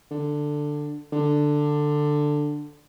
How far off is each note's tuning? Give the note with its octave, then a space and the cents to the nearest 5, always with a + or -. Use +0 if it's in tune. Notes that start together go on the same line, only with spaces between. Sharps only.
D3 +10
D3 +10